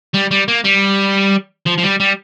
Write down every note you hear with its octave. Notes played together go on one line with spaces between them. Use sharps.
G3
G3
A#3
G3
F3
F3
G3
G3